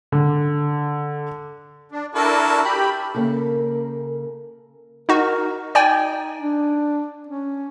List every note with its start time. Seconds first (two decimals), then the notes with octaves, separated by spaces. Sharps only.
0.12 D3
1.92 D4
2.15 D4 E4 F#4 A4 A#4
2.64 G4 B5
3.14 C#3 A#3 A4 A#4
5.09 D#4 F#4 A#4
5.75 D#4 D5 G5 G#5
6.39 D4
7.27 C#4